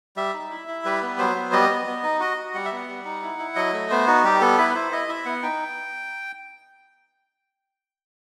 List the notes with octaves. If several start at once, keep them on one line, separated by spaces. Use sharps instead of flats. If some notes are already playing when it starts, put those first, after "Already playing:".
G3 E5
D#4
E4
E4
G3 B4
B3
F#3 C5
B3
G3 D#5
B3
B3
D#4
F#4 D#5
F#4
G3 F#5
E5
B3 F#5
G3
D#4
E4
E4
F#3 D#5
A3
B3 C5
D#4 F#4
G3 G4
B3 A4
E4 B4
E4 C5
E4 D#5
E4 E5
B3 F#5
D#4 G5